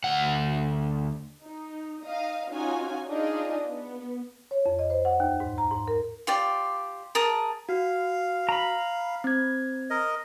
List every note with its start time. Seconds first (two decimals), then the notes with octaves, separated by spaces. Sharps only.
0.04 D2 F#5
1.43 D#4
2.05 D#4 D#5 F5
2.51 C#4 D#4 F4 F#4 G#5
3.08 D4 D#4 F4 G#4 D5 D#5
3.67 B3
4.51 C#5
4.66 F2
4.79 D#5
4.90 C5
5.05 F#5
5.20 D#2
5.40 G#2
5.58 A#5
5.71 G#2
5.88 A#4
6.27 F4 G4 D5
7.15 G#4 A#4 A5 D#6
7.69 F#4 F5
8.49 A#5 B5
9.24 C4 G#6
9.90 A#4 D#5